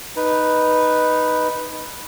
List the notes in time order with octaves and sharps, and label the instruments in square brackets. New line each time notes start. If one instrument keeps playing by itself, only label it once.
[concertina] D#4 B4